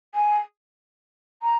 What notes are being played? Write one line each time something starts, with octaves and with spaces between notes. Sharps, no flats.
G#5
A#5